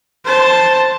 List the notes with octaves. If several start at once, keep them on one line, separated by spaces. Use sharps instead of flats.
C5 A5